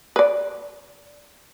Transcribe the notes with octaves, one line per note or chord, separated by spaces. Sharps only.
B4 D5